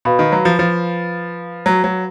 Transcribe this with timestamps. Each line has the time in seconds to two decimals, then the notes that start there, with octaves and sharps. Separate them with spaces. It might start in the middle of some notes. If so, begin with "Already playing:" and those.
0.05 B2 B4 F5 B5
0.19 D#3
0.32 F#3
0.45 F3
0.59 F3
1.66 F#3
1.84 F#3